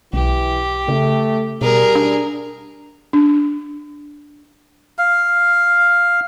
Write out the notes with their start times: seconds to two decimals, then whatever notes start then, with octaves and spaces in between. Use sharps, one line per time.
0.13 B1 E3 G4
0.88 C#3 A3
1.61 B2 G3 G#4 A#4
1.95 D4
3.13 D4
4.99 F5